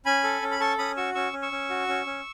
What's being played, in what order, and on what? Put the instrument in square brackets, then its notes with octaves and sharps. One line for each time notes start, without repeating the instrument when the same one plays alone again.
[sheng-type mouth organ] C#4 G#5 B5
A4
C#4
B5
A4 A5 C#6
C#4 B5 D#6
F#4 C#6 E6
C#4 C#6 E6
C#4
C#6 E6
C#4
F#4
C#4
C#4